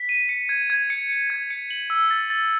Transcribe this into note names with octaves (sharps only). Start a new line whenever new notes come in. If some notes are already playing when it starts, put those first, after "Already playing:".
Already playing: B6
D#7
C#7
G#6
G#6
C#7
C#7
G#6
C#7
F#7
E6
A6
A6